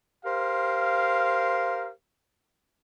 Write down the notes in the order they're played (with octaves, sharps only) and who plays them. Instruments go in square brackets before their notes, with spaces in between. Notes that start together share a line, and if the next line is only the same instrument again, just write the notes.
[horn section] G4 A#4 C5 F5